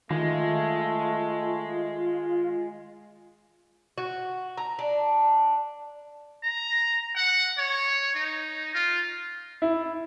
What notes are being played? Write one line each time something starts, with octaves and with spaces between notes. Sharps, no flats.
D#3 G#3 A3 F4
F#4
A#5
D4
A#5
F#5
C#5
D#4
F4
E4